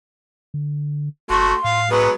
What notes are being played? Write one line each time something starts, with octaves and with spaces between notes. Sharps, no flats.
D3
F#1 A3 F#4 C6
A2 F5
F#3 G#3 B3 B4